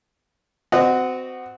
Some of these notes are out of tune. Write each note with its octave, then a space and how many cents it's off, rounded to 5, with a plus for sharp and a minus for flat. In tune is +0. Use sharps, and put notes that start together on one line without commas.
C4 -30 F#4 +0 D#5 -30